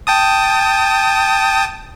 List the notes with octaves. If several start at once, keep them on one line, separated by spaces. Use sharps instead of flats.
G5 A5 D#6